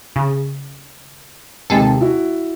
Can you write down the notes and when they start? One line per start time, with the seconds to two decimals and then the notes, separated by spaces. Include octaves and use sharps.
0.16 C#3
1.70 D#2 C3 G#3 G#4 A4
2.01 E4 F#4